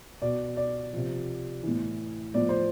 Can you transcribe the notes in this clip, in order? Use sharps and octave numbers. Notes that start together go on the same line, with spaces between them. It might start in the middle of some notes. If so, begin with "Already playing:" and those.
B2 D5
D5
C3 F3
A2 E3
A2 F3 D5
C5